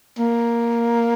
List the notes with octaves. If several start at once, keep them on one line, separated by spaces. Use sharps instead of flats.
A#3